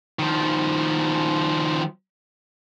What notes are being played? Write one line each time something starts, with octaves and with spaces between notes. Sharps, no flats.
D#3 F3